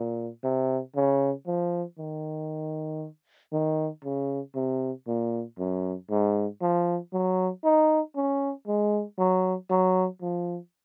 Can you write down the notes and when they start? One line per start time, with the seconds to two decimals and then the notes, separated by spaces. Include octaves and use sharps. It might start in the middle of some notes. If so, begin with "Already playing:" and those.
Already playing: A#2
0.44 C3
0.96 C#3
1.47 F3
1.98 D#3
3.53 D#3
4.04 C#3
4.55 C3
5.07 A#2
5.58 F#2
6.10 G#2
6.61 F3
7.13 F#3
7.64 D#4
8.16 C#4
8.67 G#3
9.18 F#3
9.70 F#3
10.22 F3